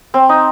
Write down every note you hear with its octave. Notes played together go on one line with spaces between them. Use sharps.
C4
D#4